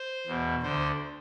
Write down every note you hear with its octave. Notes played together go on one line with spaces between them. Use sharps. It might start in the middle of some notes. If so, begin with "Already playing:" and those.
Already playing: C5
E2 B2
D2 D3 C5